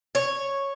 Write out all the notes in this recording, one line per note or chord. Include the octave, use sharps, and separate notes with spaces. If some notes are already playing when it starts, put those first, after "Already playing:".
C#5